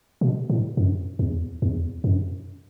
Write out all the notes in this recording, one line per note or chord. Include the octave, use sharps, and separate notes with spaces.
B2
A2
F#2
E2
E2
F#2